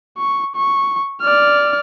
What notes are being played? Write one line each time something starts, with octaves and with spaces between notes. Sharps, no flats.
C#6
C#6
D5 F6